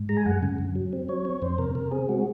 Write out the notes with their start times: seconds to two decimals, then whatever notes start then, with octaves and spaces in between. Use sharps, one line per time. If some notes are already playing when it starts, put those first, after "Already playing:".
Already playing: G#2
0.09 G#3 A#5
0.17 G#5
0.26 F#2 F#5
0.43 C#3
0.58 F#2
0.75 F#3
0.93 C4
1.09 F#3 C#5
1.25 C4
1.42 F2 C5
1.58 C3 A#4
1.75 C3 A#4
1.91 C4 G#4
2.09 G#3 F#4